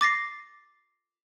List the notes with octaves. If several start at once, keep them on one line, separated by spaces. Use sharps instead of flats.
D6 A6 A#6 C7